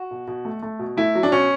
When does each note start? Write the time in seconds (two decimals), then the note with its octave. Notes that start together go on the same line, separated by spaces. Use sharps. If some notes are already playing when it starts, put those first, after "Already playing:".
Already playing: F#4
0.11 B2
0.28 B2
0.45 A3
0.62 A3
0.79 B2
0.97 A3 E4
1.15 F#3
1.23 D4
1.32 B2 C#4